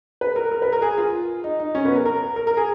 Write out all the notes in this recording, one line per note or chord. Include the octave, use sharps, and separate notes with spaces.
B4
A#4
A#4
B4
A#4
G#4
F4
D#4
D#4
C#4
B3
A#4
A#4
A#4
A#4
G#4